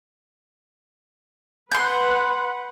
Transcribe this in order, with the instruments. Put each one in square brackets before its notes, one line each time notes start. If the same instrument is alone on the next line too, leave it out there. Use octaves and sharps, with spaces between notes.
[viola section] B4 F#5 [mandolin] C6 G6